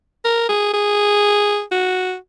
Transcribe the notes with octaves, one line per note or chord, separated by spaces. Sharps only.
A#4
G#4
G#4
F#4